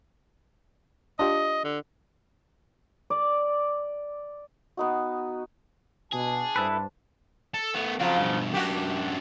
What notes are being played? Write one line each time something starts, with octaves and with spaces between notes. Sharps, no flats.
D4 F4 G4 D#5
D3
D5
B3 D#4 F#4
B2 D4 G#4 A5
G2 E4 A4 B4 C5
A4
A3 B3
C#3 F3 F#3 C4 F4
G2 B2
F#2 D4 F#4 G4